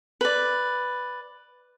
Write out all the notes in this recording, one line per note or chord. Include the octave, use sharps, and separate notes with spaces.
B4 D5